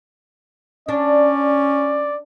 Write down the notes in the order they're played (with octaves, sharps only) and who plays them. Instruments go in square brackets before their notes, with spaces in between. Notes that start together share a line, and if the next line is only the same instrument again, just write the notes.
[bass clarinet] C#4 [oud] D4 [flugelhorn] D5